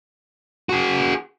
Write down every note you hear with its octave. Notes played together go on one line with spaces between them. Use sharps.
F#4 G#4